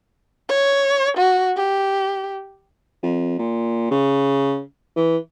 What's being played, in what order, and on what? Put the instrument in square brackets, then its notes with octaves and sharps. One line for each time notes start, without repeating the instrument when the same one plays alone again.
[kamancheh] C#5
F#4
G4
[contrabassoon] F2
A#2
C#3
E3